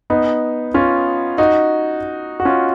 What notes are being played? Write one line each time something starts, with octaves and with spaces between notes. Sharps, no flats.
B3 D#4
C#4 F4
D#4 F#4
F#4
C#4 F4